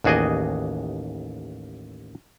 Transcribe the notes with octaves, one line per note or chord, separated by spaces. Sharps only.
A1 D#2 F#4 G#4 D5 D#5